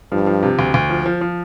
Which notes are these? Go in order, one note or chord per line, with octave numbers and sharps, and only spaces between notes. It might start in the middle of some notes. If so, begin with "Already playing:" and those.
G2 F3
F3
C3
D2
D2
F3
F3
F3